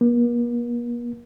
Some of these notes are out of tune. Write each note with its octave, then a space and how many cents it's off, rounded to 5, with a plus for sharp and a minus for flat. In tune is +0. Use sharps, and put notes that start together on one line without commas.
A#3 +45